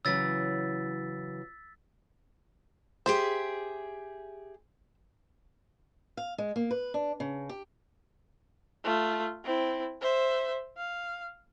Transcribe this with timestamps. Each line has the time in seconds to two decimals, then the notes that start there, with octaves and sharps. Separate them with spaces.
0.05 C#3 E3 F#3 E6 A6 B6
3.06 G4 G#4 C5 E5
6.17 F5
6.38 G#3
6.56 A#3
6.71 B4
6.94 D4
7.20 C#3
7.49 G4
8.84 A3 F4
9.44 C4 E4
10.01 C5 E5
10.77 F5